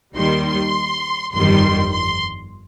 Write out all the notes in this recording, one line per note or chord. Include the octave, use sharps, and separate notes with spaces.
D#2 D#3 G3 C6
C6
G1 F2 D#3 G3 C6
C6